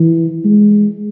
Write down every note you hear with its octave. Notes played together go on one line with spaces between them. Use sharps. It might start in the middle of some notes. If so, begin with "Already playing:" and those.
Already playing: E3
G#3